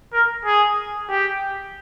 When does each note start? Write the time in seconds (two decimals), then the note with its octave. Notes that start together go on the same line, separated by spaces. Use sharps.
0.13 A#4
0.45 G#4
1.09 G4